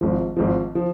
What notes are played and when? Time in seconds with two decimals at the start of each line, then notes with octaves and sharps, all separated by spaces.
0.01 G#1 G#2 F3
0.36 G#1 G#2 F3
0.75 F3